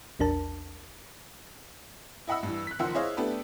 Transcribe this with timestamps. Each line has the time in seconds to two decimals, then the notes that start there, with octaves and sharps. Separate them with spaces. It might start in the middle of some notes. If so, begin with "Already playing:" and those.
0.19 A#1 E2 D4 A#4 A5
2.27 E4 D#5 F#5 B5 E6
2.43 G2 E3
2.67 F#6 B6
2.79 F#1 D#3 F3 F#5 C6 E6
2.94 E4 G#4 C5 C#5 D#5 F5
3.17 A3 B3 D4 G4 A4 B4